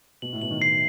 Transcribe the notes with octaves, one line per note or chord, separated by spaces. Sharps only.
B2 F#7
A2
B2 F#7
D#3
C7